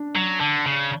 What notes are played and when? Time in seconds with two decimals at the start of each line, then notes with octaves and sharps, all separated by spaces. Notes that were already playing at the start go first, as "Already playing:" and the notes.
Already playing: D4
0.16 F#3
0.40 D3
0.66 C#3